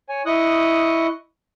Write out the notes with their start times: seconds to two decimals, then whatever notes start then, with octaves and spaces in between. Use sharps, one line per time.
0.09 C#5 G#5
0.26 E4 D#5 C#6 D#6 F#6